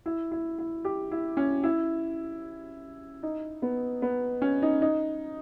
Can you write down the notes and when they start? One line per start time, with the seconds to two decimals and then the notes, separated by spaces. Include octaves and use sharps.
0.06 E4
0.31 E4
0.58 E4
0.85 G4
1.11 E4
1.37 C#4
1.63 E4
3.23 D#4
3.62 B3
4.02 B3
4.42 C#4
4.62 D#4
4.82 D#4